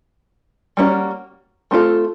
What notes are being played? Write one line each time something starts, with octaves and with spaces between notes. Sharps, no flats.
G3 A#3 C#4 F#4
A3 C4 F4 A4